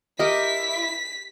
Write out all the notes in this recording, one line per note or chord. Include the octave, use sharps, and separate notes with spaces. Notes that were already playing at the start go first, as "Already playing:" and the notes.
E4 G4 A#4 D#5 B6